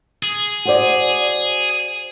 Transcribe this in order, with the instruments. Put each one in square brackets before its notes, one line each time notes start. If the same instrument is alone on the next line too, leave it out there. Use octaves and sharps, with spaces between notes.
[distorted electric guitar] G#4
[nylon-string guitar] F#4 C5 D5